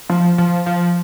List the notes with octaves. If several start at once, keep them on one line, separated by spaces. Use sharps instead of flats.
F3
F3
F3